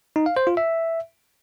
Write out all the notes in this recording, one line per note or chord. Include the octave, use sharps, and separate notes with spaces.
D#4
F5
C5
F4
E5